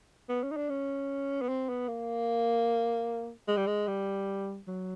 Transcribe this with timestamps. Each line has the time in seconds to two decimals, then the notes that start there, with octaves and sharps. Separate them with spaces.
0.29 B3
0.43 C#4
0.51 D#4
0.57 D4
0.69 C#4
1.42 B3
1.49 C4
1.69 B3
1.88 A#3
3.48 G#3
3.57 G3
3.67 G#3
3.88 G3
4.67 F#3